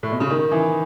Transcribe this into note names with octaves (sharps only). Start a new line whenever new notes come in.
A2
B2
C#3
D#3
E3